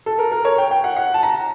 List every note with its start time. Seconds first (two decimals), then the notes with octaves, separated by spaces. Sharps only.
0.06 A4
0.19 A#4
0.32 A#4
0.45 C#5
0.58 G5
0.71 G5
0.84 F#5
0.97 F#5
1.14 A5
1.23 A#5